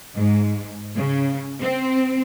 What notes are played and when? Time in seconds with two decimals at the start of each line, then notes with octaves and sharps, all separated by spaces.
0.17 G#2
0.96 C#3
1.61 C4